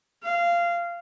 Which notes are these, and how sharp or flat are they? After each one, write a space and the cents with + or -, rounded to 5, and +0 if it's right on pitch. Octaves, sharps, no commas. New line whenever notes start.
F5 -15